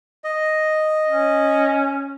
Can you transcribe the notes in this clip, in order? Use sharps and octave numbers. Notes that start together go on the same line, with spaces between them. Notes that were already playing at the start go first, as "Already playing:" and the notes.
D#5
C#4